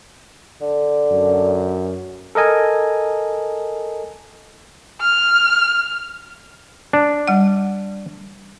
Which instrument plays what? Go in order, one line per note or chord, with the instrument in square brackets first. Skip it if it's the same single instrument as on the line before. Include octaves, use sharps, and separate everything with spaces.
[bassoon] D3
[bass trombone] F#2
[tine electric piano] A4 A#4 D#5 G#5
[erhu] F6
[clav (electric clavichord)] D4
[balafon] G3 F#5